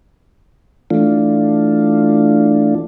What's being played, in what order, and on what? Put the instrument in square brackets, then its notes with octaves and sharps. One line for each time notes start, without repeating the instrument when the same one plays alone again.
[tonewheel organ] E3 A3 D4 F4